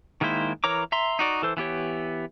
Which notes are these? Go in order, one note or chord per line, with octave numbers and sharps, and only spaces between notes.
D#3 G#3 A#3 E4 C5
E3 A#4 C#5 A#5 D6
E5 A#5 C6
D#4 F#4 D5
E3 A4 C5
E3 B3 G4 C#5